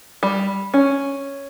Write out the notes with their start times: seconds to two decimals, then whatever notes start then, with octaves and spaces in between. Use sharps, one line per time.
0.23 G3
0.74 C#4